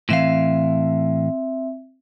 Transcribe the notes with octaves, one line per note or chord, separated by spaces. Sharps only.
A2 E3 C4 E5 F5